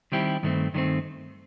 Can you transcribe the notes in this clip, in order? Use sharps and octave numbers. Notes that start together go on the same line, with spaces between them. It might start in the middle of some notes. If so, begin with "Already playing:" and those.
D#3 G3 C4 E4 G4
G2 D#3 F#3 A3 C4
G2 D#3 F#3 A3 C4